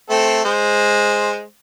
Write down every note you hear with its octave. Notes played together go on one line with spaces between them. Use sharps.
A3 C4 A4
G#3 C5